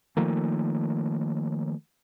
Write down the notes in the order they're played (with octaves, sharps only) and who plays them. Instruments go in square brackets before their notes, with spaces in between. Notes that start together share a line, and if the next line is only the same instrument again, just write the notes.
[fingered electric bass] D#3 F3 A3 A#3